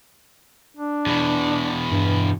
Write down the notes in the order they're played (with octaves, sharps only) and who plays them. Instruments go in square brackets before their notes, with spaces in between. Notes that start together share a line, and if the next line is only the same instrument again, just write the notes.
[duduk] D4
[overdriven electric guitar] E2 B2
[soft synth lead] G2